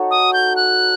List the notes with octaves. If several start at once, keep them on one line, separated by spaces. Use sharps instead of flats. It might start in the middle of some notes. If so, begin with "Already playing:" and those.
Already playing: D#4 F#4 A4 C#5
D#6
G6
F#6